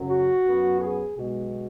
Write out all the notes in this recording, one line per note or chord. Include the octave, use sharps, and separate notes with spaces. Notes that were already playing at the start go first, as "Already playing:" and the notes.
Already playing: F#2 C#3 F#3
F#4
F#2 F#3 B3
G#4
B1 B2 G#3 F#4